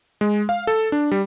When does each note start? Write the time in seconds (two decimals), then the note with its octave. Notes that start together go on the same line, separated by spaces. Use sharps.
0.21 G#3
0.49 F5
0.67 A4
0.92 D4
1.12 G3